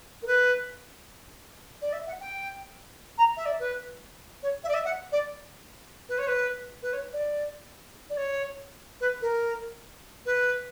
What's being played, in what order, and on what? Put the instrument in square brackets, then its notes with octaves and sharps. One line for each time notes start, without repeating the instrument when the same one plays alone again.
[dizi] A#4
B4
D5
E5
F#5
G5
A#5
E5
D5
B4
C#5
E5
D5
E5
F#5
D5
B4
C#5
B4
B4
C#5
D5
D5
C#5
B4
A#4
B4